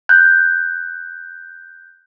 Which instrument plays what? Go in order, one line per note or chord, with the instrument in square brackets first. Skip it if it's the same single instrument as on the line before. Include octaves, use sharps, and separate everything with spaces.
[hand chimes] F#6 G6